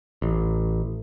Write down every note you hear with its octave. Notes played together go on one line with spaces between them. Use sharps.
A1